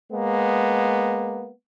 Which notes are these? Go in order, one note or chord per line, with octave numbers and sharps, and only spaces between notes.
G#3 A#3 B3